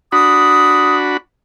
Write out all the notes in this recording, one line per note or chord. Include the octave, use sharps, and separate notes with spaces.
D4 F#4 B5 D#6